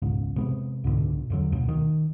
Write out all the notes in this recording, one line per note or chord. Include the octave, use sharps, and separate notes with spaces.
E1 C#2 G#2
C3 G#3 B3
C#2 G#2 B2 D3
E2 D3 F#3
D2 B2
D#3